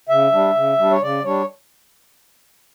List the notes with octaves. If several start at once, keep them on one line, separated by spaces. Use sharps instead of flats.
C#3 E5
G3 D4
C#3
G3 D4
C#5
C#3 D5
G3 D4 C#5